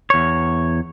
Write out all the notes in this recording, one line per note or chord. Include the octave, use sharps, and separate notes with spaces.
E2 C#5